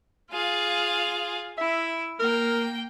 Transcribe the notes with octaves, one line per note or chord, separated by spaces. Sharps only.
F4 G#4 F5
E4 E5
A#3 A#4 G5